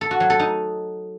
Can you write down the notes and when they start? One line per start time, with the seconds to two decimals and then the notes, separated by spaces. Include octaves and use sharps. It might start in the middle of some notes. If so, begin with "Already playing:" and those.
0.01 A4
0.11 F#4
0.20 F#3
0.30 A4
0.39 D#4